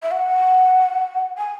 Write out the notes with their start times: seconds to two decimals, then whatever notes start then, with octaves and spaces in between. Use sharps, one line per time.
0.02 E5
0.11 F#5
1.38 G#5